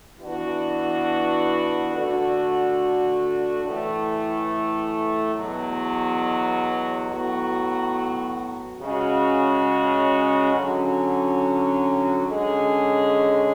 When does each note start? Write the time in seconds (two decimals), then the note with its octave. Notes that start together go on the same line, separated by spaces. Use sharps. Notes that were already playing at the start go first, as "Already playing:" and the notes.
0.20 E3 B3 D4 F#4
1.92 D3 A3 D4 F#4
3.64 A2 E3 A3
5.36 E2 B2 F#3
7.09 A2 F#3 B3 F#4
8.80 C#3 G#3 C#4 F#4
10.53 D3 F#3 C#4
12.25 D3 G#3 C#4 G#4